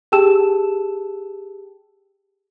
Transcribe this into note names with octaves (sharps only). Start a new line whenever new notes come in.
G4 G#4 G5 A5 E6 E7